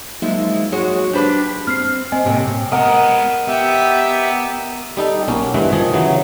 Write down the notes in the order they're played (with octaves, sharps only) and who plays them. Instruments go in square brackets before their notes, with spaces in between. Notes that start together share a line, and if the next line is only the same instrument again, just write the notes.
[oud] F3 G#3 E4 [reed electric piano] F#3 A#3 D#4
[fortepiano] G#3 [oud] F#4 G#4 C#5
[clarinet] D4 [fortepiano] G4 B4 D6 [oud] C5
[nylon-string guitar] C4 [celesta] F6 C7
[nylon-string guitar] C4 [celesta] D#5 G#5
[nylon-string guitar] A2 C3 A#3
[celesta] G5
[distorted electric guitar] G#3 B3 [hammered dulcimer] A#4 D#5 F#5
[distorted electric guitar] B3 [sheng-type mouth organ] G4 E5
[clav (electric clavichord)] G3 D#4 A4
B1 A#3 C#4
G2 E3 G#3
D#3 F3 G#4
C#3 E3 F#3